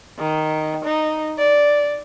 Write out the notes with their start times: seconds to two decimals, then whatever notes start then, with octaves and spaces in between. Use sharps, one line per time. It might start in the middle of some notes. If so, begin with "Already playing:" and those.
0.18 D#3
0.85 D#4
1.38 D5